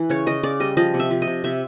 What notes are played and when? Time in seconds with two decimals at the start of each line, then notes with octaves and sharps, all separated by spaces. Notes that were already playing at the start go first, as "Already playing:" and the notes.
Already playing: E3
0.09 C#3 C#5
0.26 C#3 D#5
0.43 C#3 D5
0.60 G3 D#5
0.77 F3 D#5
0.94 C3
0.99 E5
1.11 F3
1.22 D#5
1.27 C3
1.44 C3 E5